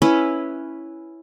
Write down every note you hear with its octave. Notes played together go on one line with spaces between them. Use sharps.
C#4 E4 B4